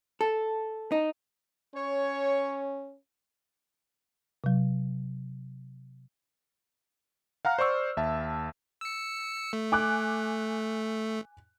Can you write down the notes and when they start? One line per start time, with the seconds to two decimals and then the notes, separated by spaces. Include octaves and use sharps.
0.21 A4
0.92 D#4
1.75 C#4 C#5
4.44 C3 F#3
7.45 F5 F#5 A#5 F6
7.59 C5 D5 C#6 E6
7.97 D#2 E5 A5
8.81 E6 C#7
9.53 A3
9.72 G#5 D6 F#6